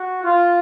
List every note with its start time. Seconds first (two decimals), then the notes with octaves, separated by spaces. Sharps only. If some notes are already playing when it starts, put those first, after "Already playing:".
Already playing: F#4
0.24 F4